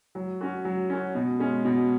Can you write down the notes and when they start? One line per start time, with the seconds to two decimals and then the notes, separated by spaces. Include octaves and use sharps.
0.15 F#3
0.41 C#4 F#4
0.65 F#3
0.90 C#4 F#4
1.15 B2
1.39 G#3 C#4
1.65 B2